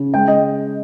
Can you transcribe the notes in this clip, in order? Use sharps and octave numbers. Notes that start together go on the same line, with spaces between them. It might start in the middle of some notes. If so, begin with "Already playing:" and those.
Already playing: C#3
G#3 G5
D#5